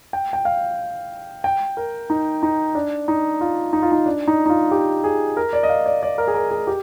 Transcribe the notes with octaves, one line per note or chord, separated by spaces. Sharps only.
G5
G5
F5
G5
A#4
D#4
D#4
D4
D#4
F4
D#4
F4
D#4
D4
D#4
D#4
F4
G4
G#4
A#4
D5
D#5
F5
D5
D5
A#4
G#4
A#4
G#4
G4